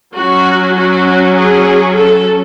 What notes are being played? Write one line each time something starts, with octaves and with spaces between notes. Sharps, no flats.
F#3 C#4 F#4
F#4
G#4
A4